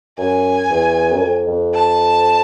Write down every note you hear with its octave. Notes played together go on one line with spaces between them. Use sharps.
F#2 G#5
E2
F#2
F2
F2
A5